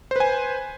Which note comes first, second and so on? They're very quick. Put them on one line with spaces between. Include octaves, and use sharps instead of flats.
C5 B4 G#5